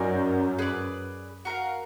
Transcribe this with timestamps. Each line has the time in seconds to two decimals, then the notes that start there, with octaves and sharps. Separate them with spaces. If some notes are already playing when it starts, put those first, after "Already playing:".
Already playing: F#2 D#4 A#4 D5 G#5
0.58 G#4 B4 D5
1.45 F#4 A#4 F5